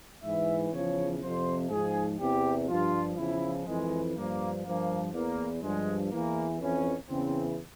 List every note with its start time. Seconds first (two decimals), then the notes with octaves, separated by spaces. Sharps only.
0.24 G#2 E3 E5
0.72 E2 C#3 F3 C#5
1.21 F2 C3 F3 C5
1.70 G#2 F3 G#4
2.19 E2 C3 E3 G4
2.68 G2 F3 F4
3.17 E2 C#3 F3 E4
3.66 F2 E3 G#3
4.16 G2 F3 A#3
4.64 G2 F3 A#3
5.13 E2 E3 A#3
5.62 G2 F3 G#3
6.11 E2 E3 A#3
6.60 F2 E3 C#4
7.09 E2 C#3 E3 C4